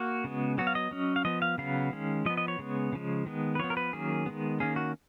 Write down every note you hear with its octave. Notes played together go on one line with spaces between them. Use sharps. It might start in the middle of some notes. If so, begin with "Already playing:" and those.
Already playing: A#3 F#4
C#3 G#3 B3
F#3 B3 F#4
F5
D#5
F#3 C#4
F5
F3 B3 D#5
F5
C#3 F#3 B3 F5
D#3 G#3 C#4
F3 B3 D#5
D#5
C#5
C#3 G#3 B3
C#3 F3 G#3
D#3 G#3 B3
B4
F3 B3 C#5
A#4
B4
D#3 F#3 A#3 C#4 G#4
D#3 G#3 B3
D#3 A#3 C#4 G#4
F#4